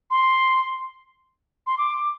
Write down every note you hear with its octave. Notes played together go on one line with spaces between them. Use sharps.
C6
C6
D6